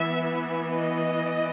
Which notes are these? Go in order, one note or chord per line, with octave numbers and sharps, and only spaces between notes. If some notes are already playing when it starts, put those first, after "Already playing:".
Already playing: E3 B3 E5
D#5